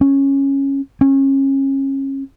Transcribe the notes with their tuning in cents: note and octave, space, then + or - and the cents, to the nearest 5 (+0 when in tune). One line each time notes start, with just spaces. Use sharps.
C#4 -10
C#4 -30